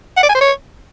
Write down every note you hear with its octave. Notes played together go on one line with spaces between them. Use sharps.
F#5
D5
G#5
C5
C#5